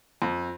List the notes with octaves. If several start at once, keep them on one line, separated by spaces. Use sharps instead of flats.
F2